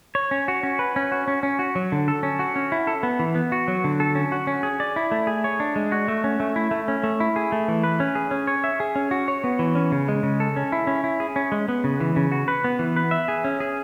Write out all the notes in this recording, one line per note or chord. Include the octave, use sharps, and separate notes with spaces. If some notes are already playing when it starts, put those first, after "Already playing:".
C#5
C#4
F#4
C#4
B4
C#4
F#4
C#4
C#4
F#4
F#3
D3
A4
C#4
F#4
C#4
E4
A4
B3
E3
B3
F#4
F#3
D3
A4
C#4
F#4
C#4
G#4
D5
E4
A3
G#4
C#5
D4
G#3
F#4
A3
C#4
A3
E4
A3
C#4
A3
E4
G#4
A3
E3
B4
C#4
G#4
C#4
C#5
E5
G#4
C#4
F#4
C#5
B3
E3
C#4
C#3
G#3
C#3
A4
C#4
E4
C#4
E4
G#4
C#4
G#3
B3
C#3
E3
C#3
F#4
B4
B3
E3
B4
E5
G#4
C#4
G#4